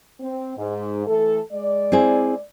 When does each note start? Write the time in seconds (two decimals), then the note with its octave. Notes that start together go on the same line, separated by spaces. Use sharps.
0.21 C4
0.57 G#2
1.07 E3 A3 A4
1.52 G#3 D5
1.92 C4 E4 G#4